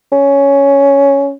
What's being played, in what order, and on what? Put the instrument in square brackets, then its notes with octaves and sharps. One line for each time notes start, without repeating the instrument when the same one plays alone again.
[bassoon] C#4